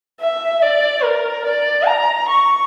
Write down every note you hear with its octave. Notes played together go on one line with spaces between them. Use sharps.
E5
D5
A#4
D5
A#5
C#6